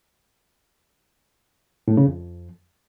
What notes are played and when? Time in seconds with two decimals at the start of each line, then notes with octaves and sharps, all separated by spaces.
1.88 A2
1.97 C#3
2.07 F2